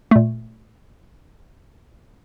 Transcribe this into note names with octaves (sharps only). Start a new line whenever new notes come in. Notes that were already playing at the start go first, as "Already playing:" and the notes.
A#2 A3